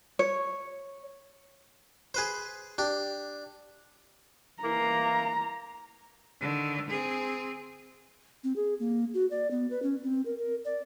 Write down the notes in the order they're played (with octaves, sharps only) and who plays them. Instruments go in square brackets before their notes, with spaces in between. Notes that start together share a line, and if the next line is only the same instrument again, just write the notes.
[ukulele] C#5
[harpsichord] G#4 B4 C5
D4 G4
[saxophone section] E3 A#3 [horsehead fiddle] A#5
[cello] D3 D#3
C4 G#4
[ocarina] C4
G#4
A#3
F#4
D5
B3
B4
C#4
C4
A#4
A#4
D5